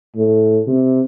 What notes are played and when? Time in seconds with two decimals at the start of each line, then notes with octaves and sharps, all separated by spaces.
0.16 A2
0.67 C3